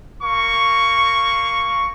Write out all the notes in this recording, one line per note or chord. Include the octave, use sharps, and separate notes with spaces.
A#3 C#6